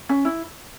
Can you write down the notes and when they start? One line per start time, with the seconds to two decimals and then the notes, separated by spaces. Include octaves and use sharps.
0.09 C#4
0.25 E4